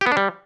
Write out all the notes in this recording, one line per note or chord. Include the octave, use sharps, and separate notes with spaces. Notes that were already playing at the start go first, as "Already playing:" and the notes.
G4
B3
D4
G3